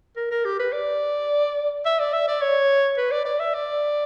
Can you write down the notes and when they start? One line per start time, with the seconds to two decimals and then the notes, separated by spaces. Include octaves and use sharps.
0.16 A#4
0.31 A#4
0.45 G4
0.59 B4
0.73 D5
1.85 E5
1.99 D5
2.13 E5
2.28 D5
2.41 C#5
2.97 B4
3.11 D5
3.25 D5
3.40 E5
3.54 D5